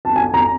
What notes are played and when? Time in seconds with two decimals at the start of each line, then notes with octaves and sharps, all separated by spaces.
0.05 A5
0.16 G#5
0.34 A#5